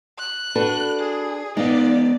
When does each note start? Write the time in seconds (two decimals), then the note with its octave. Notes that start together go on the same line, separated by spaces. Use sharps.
0.19 F#6
0.56 D4 F#4 A4 B4
1.00 G#4
1.57 G#3 B3 D#4 D5 F5